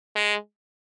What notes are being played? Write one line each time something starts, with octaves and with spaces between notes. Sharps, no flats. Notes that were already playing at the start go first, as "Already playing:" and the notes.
G#3